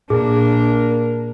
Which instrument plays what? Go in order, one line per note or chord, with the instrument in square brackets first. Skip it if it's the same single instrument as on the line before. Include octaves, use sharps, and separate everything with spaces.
[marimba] A#2 [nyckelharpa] A#3 A#4 [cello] D4 [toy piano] G#4